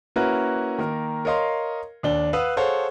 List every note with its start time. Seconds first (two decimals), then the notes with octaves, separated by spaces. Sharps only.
0.16 A#3 C#4 E4 F#4 A#4 B4
0.78 D#3 A#3 A#4
1.25 A#4 C#5 D#5 F5 C6
2.03 D#2 D4 G7
2.33 B4 F5 F#5 D#6 E6 F#6
2.57 G#4 A4 C5 C#5 F5 F#5